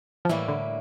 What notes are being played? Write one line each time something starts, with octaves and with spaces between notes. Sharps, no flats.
F3
A2 E3 G3 A#3 E4
D3